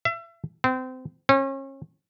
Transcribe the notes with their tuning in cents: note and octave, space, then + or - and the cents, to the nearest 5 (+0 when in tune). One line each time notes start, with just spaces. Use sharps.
E5 +35
C4 -30
C#4 -35